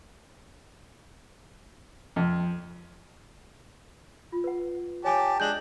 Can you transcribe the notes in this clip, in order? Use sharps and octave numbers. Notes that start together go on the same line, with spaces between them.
F2
F4
B4 F#5
G4 C#5 G#5 A5 D6
G#3 D4 G6 F#7